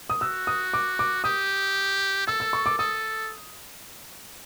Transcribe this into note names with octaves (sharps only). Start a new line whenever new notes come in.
D#6
F#4 E6
D#6
D6
D6
G4 D#6
A4 E6
E6
C#6
D6
A4 D#6